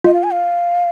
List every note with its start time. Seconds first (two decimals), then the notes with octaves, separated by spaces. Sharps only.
0.04 F4 D#5
0.14 F5
0.23 G#5
0.31 F5